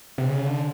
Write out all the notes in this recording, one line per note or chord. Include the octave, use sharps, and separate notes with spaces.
C3
C#3
D3